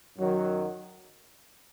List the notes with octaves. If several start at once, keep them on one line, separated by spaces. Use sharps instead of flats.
F#2 D#3 F#3